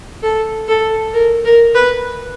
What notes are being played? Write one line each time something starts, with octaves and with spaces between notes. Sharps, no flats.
A4
A4
A#4
A#4
B4